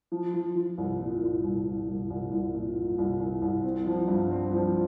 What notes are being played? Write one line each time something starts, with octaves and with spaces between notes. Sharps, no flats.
F3
F3
F3
C2
A#2
C2
C2
C2
C2
C2
C2
A#2
A#2
C2
C2
C2
C4
F3
G2
C4
F3